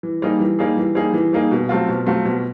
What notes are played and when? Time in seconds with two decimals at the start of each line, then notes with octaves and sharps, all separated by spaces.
0.03 E3
0.22 G3 A#3 D#4 G#4
0.40 E3
0.59 G3 A#3 D#4 G#4
0.77 E3
0.95 G3 A#3 D#4 G#4
1.14 E3
1.33 G3 A#3 D#4 G#4
1.51 B2
1.69 F#3 A3 C4 F4
1.89 B2
2.06 F#3 A3 C4 F4
2.25 B2